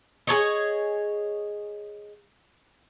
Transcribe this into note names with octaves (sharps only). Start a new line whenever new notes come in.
G#4 A4 C#5 D#5